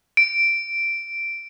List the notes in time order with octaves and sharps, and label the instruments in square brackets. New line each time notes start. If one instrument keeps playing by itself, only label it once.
[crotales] D7